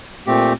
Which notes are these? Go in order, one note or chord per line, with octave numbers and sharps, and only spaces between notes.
A#2 A3 C4 G4